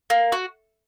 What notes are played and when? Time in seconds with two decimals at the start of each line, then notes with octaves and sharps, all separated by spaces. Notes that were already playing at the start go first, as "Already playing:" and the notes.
0.10 A#3
0.32 F#4